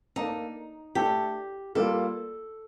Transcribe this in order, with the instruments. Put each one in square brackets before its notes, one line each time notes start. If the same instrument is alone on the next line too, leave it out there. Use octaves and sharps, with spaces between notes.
[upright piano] A#3 D4 A4 [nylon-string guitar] D#4
[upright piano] A3 D4 A4 [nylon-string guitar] G4
[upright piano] G3 A#3 F4 [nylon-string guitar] A4